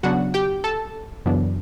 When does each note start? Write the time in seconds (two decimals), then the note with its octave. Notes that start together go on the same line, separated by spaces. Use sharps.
0.03 C#3 F#3 B3 D4 F#4 F#5
0.34 G4 G5
0.64 A4 A5
1.26 F#2 C#3 E3 B3 D4